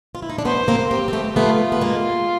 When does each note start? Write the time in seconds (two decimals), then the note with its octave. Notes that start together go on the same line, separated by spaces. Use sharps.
0.15 F4
0.22 E4
0.30 D#4
0.38 D4
0.45 B3 C#4 C5
0.68 A#3 C4
0.90 A#3 C4 G4
1.08 C4
1.13 A3 B3
1.36 A3 B3 F4
1.72 B3
1.81 G#3 A#3